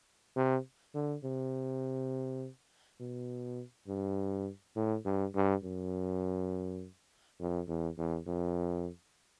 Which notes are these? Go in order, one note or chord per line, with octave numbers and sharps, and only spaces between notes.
C3
D3
C3
B2
G2
A2
G2
G2
F#2
F2
E2
E2
F2